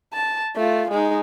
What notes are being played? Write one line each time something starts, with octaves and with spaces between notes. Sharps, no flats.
A5
A3 F4
G#3 D#4